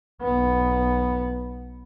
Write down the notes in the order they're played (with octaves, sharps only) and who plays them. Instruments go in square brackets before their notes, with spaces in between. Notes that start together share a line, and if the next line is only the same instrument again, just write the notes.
[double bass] B1 B3